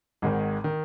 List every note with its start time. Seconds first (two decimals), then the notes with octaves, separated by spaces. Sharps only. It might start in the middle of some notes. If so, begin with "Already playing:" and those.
0.22 G#1 G#2 D#3
0.64 D#3